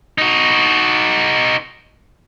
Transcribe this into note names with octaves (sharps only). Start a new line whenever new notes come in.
D#4 F#4